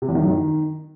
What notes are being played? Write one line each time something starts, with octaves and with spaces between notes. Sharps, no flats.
C3
E2
D#3
F#2
D#3